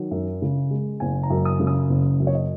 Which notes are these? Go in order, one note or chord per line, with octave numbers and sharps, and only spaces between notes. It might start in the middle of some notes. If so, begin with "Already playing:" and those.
Already playing: D#3 F#3
F#2
C#3
G#3
F#1 G#5
A#5
F#2
D#6
C#3
D#6
F#1
F#2
C#5
D#5